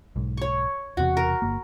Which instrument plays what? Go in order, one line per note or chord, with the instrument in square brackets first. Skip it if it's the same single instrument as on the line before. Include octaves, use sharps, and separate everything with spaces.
[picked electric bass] B1 G#2
[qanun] C#5 C#6
[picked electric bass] E1 E2 C3 [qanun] F#4
[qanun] A#4
[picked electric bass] G1 A#3